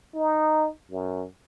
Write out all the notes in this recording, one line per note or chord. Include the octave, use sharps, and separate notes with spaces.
D#4
F#2